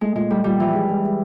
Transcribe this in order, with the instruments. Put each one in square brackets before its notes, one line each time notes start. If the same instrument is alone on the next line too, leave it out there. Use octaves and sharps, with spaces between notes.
[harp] G#3 [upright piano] A3
[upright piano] A#2 [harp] G#3
[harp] G3 [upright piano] A3
[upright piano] A#2 [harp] G3
[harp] E3 [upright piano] F3
[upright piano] G#3
G#3
G#3